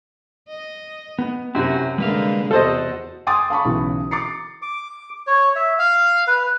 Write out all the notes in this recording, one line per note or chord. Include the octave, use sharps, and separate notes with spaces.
D#5
B3
F#2 C3 E4 F#4 G4
D3 G3 G#3 A#3 B4 F5
E2 C3 F#4 A4 C5 D#5
G5 G#5 C6 D6 D#6 A6
F5 A5 B5 C#6
B1 C#3 E3
D6 A6 C7 C#7
D6
C#5
E5
F5
B4